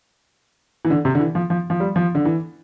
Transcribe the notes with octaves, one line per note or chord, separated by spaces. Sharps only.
E3
D3
C3
D3
E3
F3
F3
F3
G3
F3
D3
E3